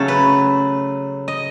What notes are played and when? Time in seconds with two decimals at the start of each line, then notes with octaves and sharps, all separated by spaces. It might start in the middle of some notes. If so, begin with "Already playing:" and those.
Already playing: C#3 F#3 A3 C#4 A4
0.08 B4
1.28 D#5